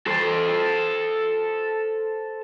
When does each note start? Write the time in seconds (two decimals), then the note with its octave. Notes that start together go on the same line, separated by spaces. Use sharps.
0.07 A4 C5